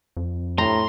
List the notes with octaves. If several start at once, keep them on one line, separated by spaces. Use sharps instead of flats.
F2
A2 A#5 C6